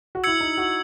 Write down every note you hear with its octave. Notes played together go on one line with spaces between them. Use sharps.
F#4
E4 E6 G#6 C#7 F#7
D#4
F#4